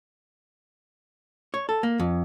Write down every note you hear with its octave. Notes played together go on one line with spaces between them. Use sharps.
C#5
A4
A#3
F2